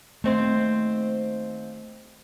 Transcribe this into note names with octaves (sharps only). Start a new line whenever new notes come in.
D#2 A3 C4 C5